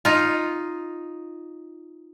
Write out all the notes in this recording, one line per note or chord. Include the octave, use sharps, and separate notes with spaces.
D#4 F4